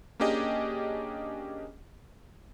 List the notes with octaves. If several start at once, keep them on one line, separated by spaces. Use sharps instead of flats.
A#3 C#4 D4 G4 G#4 D#5